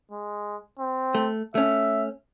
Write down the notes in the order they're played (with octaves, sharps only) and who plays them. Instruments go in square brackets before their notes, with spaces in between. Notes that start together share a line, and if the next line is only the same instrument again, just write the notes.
[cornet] G#3
C4
[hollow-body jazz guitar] A3
[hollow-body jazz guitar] A3 C#4 [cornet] E5